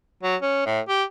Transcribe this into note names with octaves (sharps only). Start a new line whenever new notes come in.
F#3
C#4
A2
G4